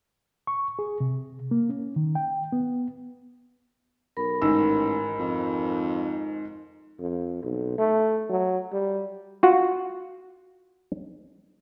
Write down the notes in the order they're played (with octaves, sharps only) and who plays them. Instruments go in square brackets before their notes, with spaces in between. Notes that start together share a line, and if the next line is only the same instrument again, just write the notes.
[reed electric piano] C#6
G#4
C3
A#3
C#4
D#3
G5
B3
[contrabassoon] B1 [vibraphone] A#4 B5
[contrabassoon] A1 [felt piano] G#2 D#3 E6
[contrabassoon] F2
[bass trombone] F2
B1
A3
F#3
G3
[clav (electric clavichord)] F4 F#4 F#5